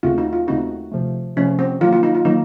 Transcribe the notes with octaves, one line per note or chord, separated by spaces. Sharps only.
D#2 C#3 A3 C4 F4 F#4
D#4
F4
D#2 C#3 A3 C4 D#4 F#4
C3 F3 A3
C3 F3 A3 C#4
C4
D#3 F#3 A#3 F4
F4
D#4
F4
D#3 F#3 A#3 D#4